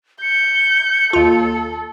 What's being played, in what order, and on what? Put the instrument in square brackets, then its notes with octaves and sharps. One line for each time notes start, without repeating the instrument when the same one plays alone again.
[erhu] G6 [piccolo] C#7
[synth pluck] D#2 F4 [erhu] A4